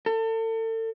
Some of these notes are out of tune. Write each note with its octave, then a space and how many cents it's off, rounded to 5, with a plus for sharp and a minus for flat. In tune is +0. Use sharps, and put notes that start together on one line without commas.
A4 +35